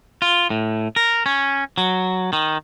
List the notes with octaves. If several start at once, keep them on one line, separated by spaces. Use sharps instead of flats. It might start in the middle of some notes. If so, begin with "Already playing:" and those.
F4
A2
A#4
C#4
F#3
D#3